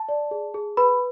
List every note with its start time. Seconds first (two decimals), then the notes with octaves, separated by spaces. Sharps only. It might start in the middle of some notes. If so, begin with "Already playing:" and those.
Already playing: A5
0.09 D5
0.31 G#4
0.54 G#4
0.77 B4 B5